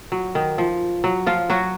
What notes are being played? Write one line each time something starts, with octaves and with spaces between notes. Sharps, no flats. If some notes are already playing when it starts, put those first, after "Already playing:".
F#3
D#3
F3
F#3
F3 F4
F#3 F#4